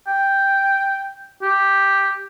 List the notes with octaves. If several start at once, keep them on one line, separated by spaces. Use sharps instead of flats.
G5
G4